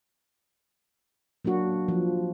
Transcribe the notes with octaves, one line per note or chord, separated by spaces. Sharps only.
F#3 A#3 D4 F#4
F3